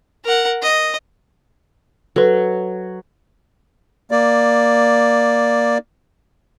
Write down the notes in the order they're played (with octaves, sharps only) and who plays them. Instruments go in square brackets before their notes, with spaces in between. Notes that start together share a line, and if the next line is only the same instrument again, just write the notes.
[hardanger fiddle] A#4 F#5
D#5
[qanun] F#3 [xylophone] A4 B4
[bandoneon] A#3 D5